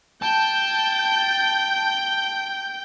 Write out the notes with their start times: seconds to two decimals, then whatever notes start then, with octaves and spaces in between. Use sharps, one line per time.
0.22 G5 A5 G6